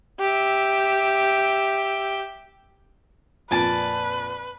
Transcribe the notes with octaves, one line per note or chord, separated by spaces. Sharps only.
G4 E5
F2 A#2 B4 D5 G#5 A5